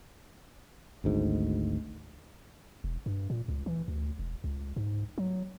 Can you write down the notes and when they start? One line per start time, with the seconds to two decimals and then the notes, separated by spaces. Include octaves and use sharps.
1.04 G#1 D2 G#2
2.84 E1
3.06 G2
3.30 A#2
3.48 C#2
3.66 E3
3.88 D2
4.19 E1
4.44 C#2
4.76 G#2
5.18 F#3